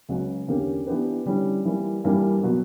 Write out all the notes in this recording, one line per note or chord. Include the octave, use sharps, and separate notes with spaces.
C#2 C#3 F#3 C#4 F#4
E2 D3 A#3 C#4 G4
E3 B3 D4 G4 B4
D3 G3 C#4 E4
E3 G3 A#3
G2 E3 G3 A#3 D4
B2 F#3 B3 F#4